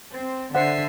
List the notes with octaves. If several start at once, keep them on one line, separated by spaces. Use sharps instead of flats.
C4
D3 C5 E5 F#5 C7